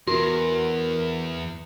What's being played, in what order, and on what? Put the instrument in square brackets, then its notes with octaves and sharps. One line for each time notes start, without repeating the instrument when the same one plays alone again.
[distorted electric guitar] E2 [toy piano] F#4 [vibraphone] A#4